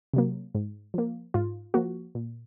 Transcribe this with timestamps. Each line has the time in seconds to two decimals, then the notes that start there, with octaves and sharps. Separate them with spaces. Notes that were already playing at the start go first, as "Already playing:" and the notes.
0.13 C3 F#3 A#3
0.55 G#2
0.94 F3 A#3
1.34 G#2 F4
1.74 F3 A#3 F#4
2.15 A#2